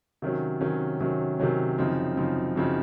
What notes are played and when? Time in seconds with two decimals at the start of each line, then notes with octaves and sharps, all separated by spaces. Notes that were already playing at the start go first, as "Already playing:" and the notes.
0.22 C3 D#3 F#3 C#4
0.61 C3 D#3 F#3 C#4
1.00 C3 D#3 F#3 C#4
1.39 C3 D#3 F#3 C#4
1.78 F#2 C#3 F3 C4 D#4
2.17 F#2 C#3 F3 C4 D#4
2.56 F#2 C#3 F3 C4 D#4